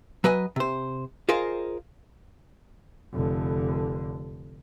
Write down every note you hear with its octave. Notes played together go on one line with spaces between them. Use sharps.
F#3 B4 D#5 G#5
C3 C5
F4 G#4 A#4 C5 D#5 F5
F1 D3